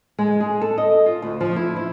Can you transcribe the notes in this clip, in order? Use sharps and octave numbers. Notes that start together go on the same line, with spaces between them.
G#3
G#4
A4
D#5
F4
D2
F3
E4
E4